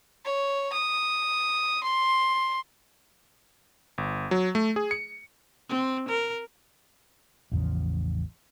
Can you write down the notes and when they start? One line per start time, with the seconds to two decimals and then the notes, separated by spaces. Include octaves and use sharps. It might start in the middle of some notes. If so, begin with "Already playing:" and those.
0.25 C#5
0.73 D#6
1.83 C6
3.98 G1
4.31 F#3
4.55 A3
4.76 G#4
4.91 C#7
5.69 C4
6.09 A#4
7.52 A1 E2 C#3 F3